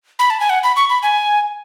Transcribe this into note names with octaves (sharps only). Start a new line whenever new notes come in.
B5
A5
G#5
F#5
B5
C#6
B5
G#5